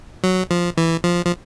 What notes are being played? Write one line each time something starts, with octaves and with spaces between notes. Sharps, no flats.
F#3
F3
E3
F3
F3